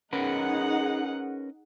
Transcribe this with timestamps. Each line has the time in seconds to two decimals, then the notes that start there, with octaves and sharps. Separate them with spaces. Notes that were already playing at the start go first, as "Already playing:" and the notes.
0.13 C#4 D#4 G#4 A#4 B4 F#5